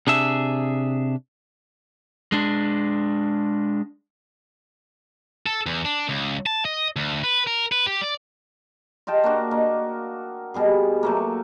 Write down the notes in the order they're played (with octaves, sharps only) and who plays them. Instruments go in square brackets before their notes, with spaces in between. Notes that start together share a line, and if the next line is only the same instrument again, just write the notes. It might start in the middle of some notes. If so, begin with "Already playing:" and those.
[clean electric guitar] C3 D4 G#4 E5
[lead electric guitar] G#3 D4
[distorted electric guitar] A4
E2
D4
C#2
A5
D#5
D2
B4
A#4
B4
G4
D5
[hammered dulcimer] F4 D#5 G5 A5
A#3 D4 F#4 F#5
A#3 D#5 C#6
B2 G3 G#4
F#3 A3 A#3